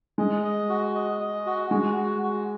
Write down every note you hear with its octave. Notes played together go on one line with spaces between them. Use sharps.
G#3 D#5
D#5
F#4
D#5
D#5
F#4
G#3 F#4
F#4
F#4